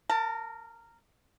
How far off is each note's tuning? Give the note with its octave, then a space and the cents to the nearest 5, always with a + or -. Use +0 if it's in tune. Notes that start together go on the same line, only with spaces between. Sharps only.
A#4 -15 A5 +20